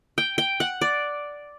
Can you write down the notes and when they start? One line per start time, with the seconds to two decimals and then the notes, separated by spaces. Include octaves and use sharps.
0.18 G5
0.38 G5
0.60 F#5
0.81 D5